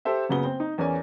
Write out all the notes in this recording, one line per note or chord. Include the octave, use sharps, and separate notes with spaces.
G4 A4 C5 E5
F#1 C#3 B3 F#4 G7
C4
D#4
E2 C#4 A#4 D5 G#5